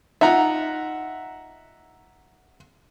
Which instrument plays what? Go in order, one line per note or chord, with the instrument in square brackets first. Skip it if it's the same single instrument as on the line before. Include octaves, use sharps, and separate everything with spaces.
[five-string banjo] D#4 F4 [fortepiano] E5 F#5 A#5